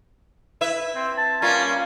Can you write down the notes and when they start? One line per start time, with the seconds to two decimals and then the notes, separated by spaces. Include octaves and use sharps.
0.61 E4 B4 E5
0.95 C4
1.18 A5
1.42 G3 A#3 C#4 F4